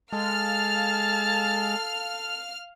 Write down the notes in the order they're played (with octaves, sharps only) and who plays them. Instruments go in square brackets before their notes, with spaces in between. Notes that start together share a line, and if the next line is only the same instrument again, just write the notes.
[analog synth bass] G#3 [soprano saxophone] A4 [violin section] F5 F6 [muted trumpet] A5